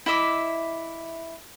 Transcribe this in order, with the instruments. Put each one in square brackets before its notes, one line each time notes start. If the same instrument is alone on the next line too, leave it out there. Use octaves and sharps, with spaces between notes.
[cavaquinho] E4 D#5 E5 D6